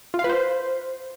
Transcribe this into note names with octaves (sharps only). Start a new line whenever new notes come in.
F4
F5
B4
C5